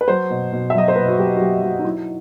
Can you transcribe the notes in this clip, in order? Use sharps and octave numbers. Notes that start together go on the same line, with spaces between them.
B4
F#3 C5
B2
B2
E5
F#3 D#5
C5
B2 B4
F#4
F#3 G4
F#4
F#3 G4
F#3 F#4
D#4
F#3 E4